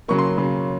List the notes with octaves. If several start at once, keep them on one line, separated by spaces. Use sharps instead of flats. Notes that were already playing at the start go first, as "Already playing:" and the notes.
C#3 F#3 A#3 C#6
C6
C#3 F#3 A#3